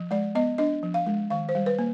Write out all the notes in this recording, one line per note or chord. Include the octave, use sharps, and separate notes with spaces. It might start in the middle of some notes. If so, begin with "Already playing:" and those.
Already playing: F3
G#3 D5
B3 D#5
D4 D#5
F3
F5
G#3
D#3 F5
C5
G3
B4
A#3